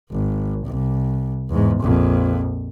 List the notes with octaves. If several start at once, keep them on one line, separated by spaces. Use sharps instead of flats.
G#1
C2
E2 G#2
A#1 F2